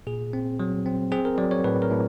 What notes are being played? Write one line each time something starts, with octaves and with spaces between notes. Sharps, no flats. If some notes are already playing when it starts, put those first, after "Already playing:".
A#2 G#4
C4
F#3
C4
C4 G#4
A#4
F#3 D5
C#5
A2 B4
A#4
A2